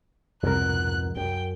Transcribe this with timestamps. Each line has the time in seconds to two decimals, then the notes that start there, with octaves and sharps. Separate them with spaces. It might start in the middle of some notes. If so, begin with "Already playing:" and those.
0.43 C2 F2 G#2 B2 A#4 F#6
1.17 F#2 G5